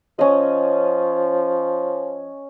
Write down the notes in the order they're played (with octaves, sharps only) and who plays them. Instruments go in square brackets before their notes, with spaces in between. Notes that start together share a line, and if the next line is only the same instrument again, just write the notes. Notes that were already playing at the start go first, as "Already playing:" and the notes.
[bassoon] F3 [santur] C#4 D#5